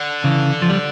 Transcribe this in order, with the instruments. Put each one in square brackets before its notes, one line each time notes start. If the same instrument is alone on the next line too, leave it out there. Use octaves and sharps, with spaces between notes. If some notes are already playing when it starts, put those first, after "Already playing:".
Already playing: [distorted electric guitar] D3
[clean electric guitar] C#3 E3
F3
G3